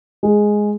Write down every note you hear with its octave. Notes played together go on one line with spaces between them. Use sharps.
G#3